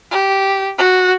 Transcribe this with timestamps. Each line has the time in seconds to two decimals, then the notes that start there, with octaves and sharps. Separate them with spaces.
0.11 G4
0.78 F#4